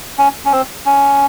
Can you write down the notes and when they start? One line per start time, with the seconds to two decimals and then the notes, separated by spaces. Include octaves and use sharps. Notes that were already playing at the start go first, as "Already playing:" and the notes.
0.18 C#4
0.45 C#4
0.52 C4
0.86 C#4